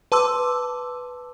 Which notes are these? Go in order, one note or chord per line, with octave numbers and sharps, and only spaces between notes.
B4 A5 C6 D6 E6